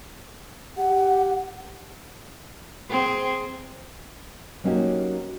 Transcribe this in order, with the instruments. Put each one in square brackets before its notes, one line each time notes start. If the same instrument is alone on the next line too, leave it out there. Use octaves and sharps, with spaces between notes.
[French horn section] G4 [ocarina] F#5
[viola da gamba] C4 G#4
[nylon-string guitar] F#3 A#3 C#4 D#4 F#4 G4